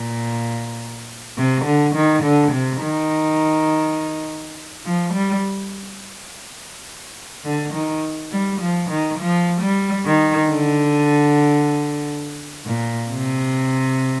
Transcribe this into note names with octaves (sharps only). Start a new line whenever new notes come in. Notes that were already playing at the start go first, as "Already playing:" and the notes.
Already playing: A#2
C3
D3
D#3
D3
C3
D#3
F3
G3
D3
D#3
G3
F3
D#3
F3
G3
D#3
D3
A#2
C3